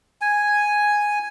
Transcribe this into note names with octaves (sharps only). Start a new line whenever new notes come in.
G#5